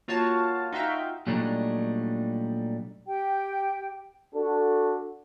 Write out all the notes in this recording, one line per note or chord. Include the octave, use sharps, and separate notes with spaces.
A#3 F4 F#4 C#5 F5 A5
D#4 F4 F#4 E5 F5 G5
A#2 F#3 G3 A3 D4 D#4
G4 G5
D4 F#4 A4